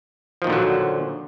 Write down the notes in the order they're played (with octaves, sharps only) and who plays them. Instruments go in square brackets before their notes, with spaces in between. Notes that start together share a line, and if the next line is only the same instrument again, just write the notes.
[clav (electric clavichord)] F3
D#3
A#2
D3
F#3